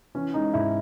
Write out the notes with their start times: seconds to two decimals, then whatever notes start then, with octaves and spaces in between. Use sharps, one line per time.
0.15 E3 C#4
0.34 G#3 D#4
0.53 G#2 E4